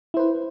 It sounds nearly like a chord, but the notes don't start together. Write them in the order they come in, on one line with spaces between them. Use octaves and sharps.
E4 C5 B4